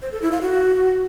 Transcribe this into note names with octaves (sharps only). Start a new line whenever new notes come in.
C5
A4
E4
F5
F#4